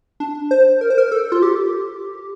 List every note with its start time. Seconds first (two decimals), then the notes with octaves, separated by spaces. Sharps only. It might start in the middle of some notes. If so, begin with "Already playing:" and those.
0.20 D4
0.51 C5
0.81 A#4
0.90 C5
0.98 A#4
1.12 A4
1.32 F4
1.43 G4